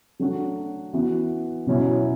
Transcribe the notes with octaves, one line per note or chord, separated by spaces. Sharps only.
F#3 A3 D4 F#4
E3 B3 F#4
B2 F#3 C#4 E4